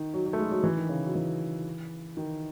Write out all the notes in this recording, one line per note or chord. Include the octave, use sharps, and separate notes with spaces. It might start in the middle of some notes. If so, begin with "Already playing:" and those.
Already playing: D#3
F#3
F#3
A3
G#3
F#3
E3
D#3
C#3
F#3
E3
D#3